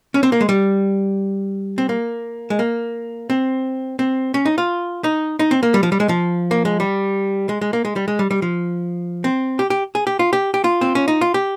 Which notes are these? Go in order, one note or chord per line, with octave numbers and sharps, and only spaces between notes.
C#4
C4
A#3
G#3
G3
C4
A#3
G#3
A#3
C4
C4
C#4
D#4
F4
D#4
D#4
C4
A#3
G3
F3
G3
G#3
F3
A#3
G#3
G3
G#3
G#3
A#3
G#3
G3
G#3
G3
G3
F3
C4
G4
G4
G#4
G4
F4
G4
G4
F4
C4
C#4
D#4
F4
G4